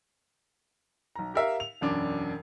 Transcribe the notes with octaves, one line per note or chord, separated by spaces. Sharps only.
B1 A#5
G4 A#4 E5 F5
F7
E1 F#2 D4 D6